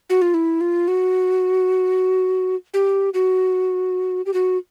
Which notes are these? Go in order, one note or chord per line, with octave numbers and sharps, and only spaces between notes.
F#4
F4
E4
F4
F#4
G4
F#4
G4
F#4